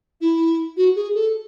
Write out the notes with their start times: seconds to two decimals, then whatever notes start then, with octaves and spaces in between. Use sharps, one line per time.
0.21 E4
0.77 F#4
0.96 G#4
1.15 A4